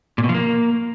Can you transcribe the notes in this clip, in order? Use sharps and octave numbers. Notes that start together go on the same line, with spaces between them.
A#2
B2
F3
A#3